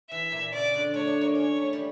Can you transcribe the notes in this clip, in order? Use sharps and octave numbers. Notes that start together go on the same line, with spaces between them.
E3 E5
A#2
C#3 D5
D3
A3 C#5
D4
A#3
C#4 C#5
A3
G3